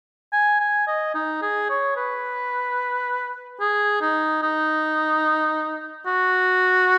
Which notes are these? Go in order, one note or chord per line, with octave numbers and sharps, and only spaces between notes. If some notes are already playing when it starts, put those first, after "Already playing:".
G#5
G#5
D#5
D#4
G#4
C#5
B4
G#4
D#4
D#4
F#4